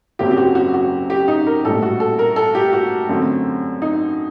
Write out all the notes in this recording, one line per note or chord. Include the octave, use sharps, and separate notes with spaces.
F#1 F#2 F#3 C4 G4
G4
F#4
F#4
F#4
G4
D#4
A#4
A#1 A2 G3 A4
F#4
A4
A#4
A4
G4
F#4
F#2 D3 A3 C4
D#4